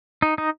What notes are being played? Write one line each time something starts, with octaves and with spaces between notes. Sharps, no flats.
D#4
D#4